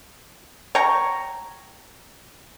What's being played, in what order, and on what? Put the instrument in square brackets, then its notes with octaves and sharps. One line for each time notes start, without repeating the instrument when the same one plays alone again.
[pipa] C#5 G5 A#5